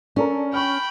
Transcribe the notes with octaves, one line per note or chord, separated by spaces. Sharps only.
C#4 D4 A4 A#4
G5 B5 C#6 F6